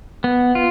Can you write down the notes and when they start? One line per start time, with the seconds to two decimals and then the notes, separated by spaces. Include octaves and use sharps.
0.24 B3
0.55 F4